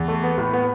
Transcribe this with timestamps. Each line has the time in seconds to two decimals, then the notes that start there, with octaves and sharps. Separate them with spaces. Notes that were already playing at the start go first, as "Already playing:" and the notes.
Already playing: E2
0.08 A3
0.23 B3
0.38 A2
0.53 B3